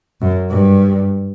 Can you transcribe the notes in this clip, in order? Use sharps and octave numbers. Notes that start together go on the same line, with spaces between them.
F#2
G2